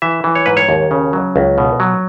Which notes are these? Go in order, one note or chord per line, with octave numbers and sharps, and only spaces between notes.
E3 E5
E3
C#5
G#2 B4
C#5
D#2
C#3
F#3
C#2
B2
F#3